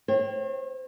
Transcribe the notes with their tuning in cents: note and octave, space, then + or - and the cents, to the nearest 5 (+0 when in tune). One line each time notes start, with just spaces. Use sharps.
C4 -20 C#5 -40